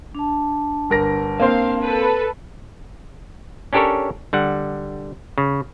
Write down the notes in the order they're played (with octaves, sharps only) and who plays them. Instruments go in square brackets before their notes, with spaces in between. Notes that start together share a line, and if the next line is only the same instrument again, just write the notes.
[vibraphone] D4 A5
[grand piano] G1 A#4 A#6
[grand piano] A#3 C4 C5 [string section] F5
[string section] A4 B4
[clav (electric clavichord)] C#4 D4 G4 A4 A#4 C#5
D3 G3 F#5
C#3